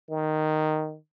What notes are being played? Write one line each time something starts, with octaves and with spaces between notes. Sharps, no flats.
D#3